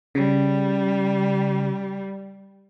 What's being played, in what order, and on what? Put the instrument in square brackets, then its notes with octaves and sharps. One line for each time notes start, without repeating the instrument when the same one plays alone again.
[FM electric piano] C#3 [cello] G3